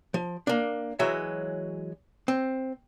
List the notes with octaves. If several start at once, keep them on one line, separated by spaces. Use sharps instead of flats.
F3
A#3 D4
E3 F#3 G#3 F#4 C#5 E5
C4